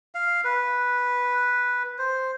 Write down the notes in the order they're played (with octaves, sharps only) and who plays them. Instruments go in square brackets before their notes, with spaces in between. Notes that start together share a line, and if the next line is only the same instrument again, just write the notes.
[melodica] F5
B4
C5